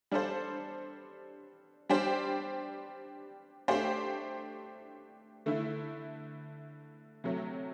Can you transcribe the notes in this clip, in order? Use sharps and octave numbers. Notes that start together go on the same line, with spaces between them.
G3 D4 A4 C5
G3 D4 G4 C5
A3 D4 G4 C5
D3 A3 E4
C3 F#3 A3